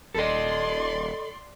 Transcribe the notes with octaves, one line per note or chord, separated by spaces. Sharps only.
D#1 A4 D5 D#5 C6